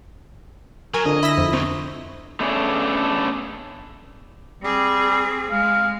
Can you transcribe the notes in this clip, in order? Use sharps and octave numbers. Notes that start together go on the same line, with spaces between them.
F#3 A#4 G#5
F2 D3 D4 D#5
E4 B5 E6 A#6
F2
C2 F#3 C4
A3 B3 C#4 D4 G#4 A4
G3 C4 G#4
G#3 F5